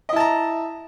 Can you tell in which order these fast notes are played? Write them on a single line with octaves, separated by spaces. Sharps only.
D#5 E4 A5 A#5